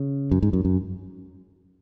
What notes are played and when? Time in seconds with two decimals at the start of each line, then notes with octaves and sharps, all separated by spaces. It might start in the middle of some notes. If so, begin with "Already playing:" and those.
Already playing: C#3
0.31 F#2
0.42 G#2
0.53 F#2
0.65 F#2